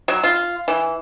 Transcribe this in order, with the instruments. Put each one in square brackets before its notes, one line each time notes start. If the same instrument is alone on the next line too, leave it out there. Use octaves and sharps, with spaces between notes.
[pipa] F#3
F4
E3